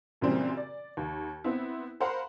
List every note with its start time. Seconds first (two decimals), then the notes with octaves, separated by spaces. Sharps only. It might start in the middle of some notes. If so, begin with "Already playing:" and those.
0.21 F#2 A#2 C#3 E3 G3 C4
0.57 D5
0.97 D#2
1.44 B3 C4 E4
2.00 A#4 C5 F5 F#5 B5 C6